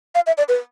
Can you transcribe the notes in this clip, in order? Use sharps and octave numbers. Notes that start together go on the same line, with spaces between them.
F5
E5
D5
B4